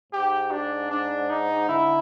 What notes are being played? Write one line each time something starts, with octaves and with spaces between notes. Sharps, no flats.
G#2 G4
D4
D4
D#4
D3 E4